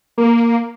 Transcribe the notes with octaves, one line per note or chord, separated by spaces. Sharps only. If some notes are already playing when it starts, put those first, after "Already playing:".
A#3